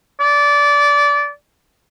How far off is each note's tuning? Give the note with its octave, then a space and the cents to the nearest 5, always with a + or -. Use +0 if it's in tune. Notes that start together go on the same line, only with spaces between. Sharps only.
D5 -20